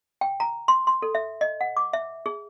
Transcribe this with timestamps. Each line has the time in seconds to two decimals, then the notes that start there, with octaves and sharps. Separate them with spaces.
0.21 G5
0.40 A#5
0.68 C6
0.87 C6
1.02 A4
1.15 E5
1.41 D#5
1.61 F#5
1.77 D6
1.93 E5
2.26 G#4